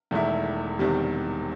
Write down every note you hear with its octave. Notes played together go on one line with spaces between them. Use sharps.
E1 E2 D#3 A3 E4
E1 E2 C3 D#3 G3